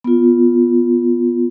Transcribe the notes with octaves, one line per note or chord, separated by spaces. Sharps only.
B3 F4